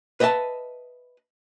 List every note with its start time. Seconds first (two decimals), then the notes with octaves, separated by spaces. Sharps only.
0.20 B4 D#5 E5 G#5 A5